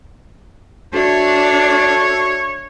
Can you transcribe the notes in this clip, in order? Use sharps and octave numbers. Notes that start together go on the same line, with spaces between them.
D4 F#4 A4 C#5 E5